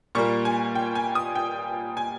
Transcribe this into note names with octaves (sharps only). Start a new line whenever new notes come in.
A#2 G3 A#3 C#6
G#5
G5
G#5
D#6
G5
G#5